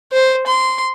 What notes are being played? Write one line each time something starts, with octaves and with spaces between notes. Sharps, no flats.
C5
C6